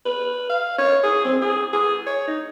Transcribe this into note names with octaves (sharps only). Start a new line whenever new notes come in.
B4
F5
C#5
G#4
C4
G#4
G#4
C#5
D#4